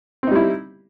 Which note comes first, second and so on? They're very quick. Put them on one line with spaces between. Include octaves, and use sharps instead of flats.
C4 D#4 G3 E4